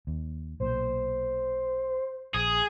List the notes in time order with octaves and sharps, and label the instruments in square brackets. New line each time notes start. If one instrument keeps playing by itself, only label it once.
[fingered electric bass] D#2
[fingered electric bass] B1 A#2 [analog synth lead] C5
[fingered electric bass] A#1 [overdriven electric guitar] G#4